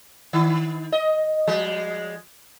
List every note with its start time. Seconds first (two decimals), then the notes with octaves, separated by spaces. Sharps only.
0.33 D#3
0.92 D#5
1.47 F3 G#3